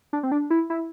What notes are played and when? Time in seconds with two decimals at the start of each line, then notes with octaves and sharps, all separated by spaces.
0.13 D4
0.23 C4
0.32 D4
0.50 E4
0.70 E4